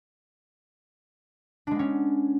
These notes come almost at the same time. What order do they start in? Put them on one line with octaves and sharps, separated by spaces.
D4 G#3 B3 C#4